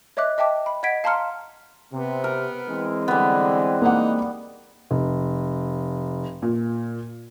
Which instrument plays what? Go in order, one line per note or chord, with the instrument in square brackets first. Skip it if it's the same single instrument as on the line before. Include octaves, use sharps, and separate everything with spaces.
[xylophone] C#5 D#5 E5 D6 F#6
D#5 E5 G5 A5 D6
B5
D#5 F#5 G#6 B6 D7
F5 A5 A#5 C6 F6 C#7
[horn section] C3 [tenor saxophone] B3
[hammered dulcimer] A#4
[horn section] E3 G#3 C4
[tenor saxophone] D3 [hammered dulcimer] G3 B3
[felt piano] A#3 F#5 [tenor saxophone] D#4
[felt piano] F1
A#2